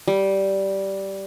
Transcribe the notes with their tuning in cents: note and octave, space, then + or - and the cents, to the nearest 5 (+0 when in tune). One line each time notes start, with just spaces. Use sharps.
G3 -10